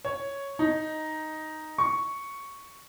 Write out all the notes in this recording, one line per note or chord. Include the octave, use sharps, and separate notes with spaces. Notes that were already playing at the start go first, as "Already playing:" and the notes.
C#5
D#4
C#6